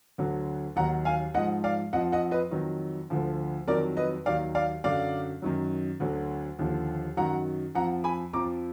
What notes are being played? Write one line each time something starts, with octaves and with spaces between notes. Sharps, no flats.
D2 D3 F#3
D#2 D#3 F#3 F#5 A#5
F5 G#5
G#2 F3 D#5 F#5
D5 F5
F2 F3 D#5 F#5
D#5 F#5
B4 D#5
F2 D#3 F#3
D2 D3 F3
F2 D#3 F#3 A#4 D5
B4 D#5
D#2 D#3 F#3 D5 F5
D5 F5
F#2 D3 F#3 D5 F5
F#2 D#3 F#3
D2 D3 F#3
D#2 D3 F3
F#2 D#3 F#3 F#5 A#5
F2 F3 F#5 A#5
G#5 B5
F2 F3 A#5 D6